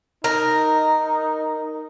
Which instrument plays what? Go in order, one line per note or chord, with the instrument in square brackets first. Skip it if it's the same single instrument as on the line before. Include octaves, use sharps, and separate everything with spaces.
[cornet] D#4 [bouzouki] A#4